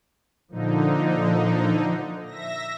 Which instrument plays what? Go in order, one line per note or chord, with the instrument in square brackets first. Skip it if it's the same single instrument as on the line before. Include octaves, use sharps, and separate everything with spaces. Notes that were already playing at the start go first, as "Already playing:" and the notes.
[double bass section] A#2 F3 [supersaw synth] D3 D#4
[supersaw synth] E5 A#6